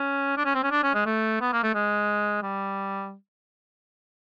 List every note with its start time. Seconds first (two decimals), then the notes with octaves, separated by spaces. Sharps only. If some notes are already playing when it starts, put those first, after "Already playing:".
Already playing: C#4
0.37 D4
0.45 C#4
0.55 C4
0.63 C#4
0.71 D4
0.83 C#4
0.94 G#3
1.06 A3
1.41 B3
1.52 A#3
1.63 A3
1.75 G#3
2.42 G3